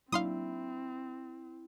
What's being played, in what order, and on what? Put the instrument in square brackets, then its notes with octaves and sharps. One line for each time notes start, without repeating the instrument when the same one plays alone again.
[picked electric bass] F#3 A#3 D4 [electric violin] C4 [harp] E4 [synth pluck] F5 C6 D#6